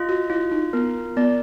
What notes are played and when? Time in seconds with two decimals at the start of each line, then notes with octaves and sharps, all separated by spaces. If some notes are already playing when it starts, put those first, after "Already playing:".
Already playing: F4 D#5
0.09 F#4
0.30 E4 F4
0.51 D#4
0.73 B3 A#4
1.17 B3 D5